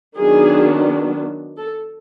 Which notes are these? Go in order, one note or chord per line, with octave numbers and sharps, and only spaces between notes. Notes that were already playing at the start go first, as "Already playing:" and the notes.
D#3 F#3 B3 D4 G#4
A4